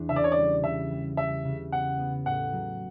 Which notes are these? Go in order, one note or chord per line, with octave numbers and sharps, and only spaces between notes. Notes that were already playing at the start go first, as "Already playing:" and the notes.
Already playing: E2 D4
C#3 E5
D5
C#5
D5
G3
C#3 E5
G3
G3 E5
C#3
B3 F#5
B3
A2 F#5
F#3